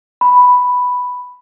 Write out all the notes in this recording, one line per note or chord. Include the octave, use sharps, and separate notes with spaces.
B5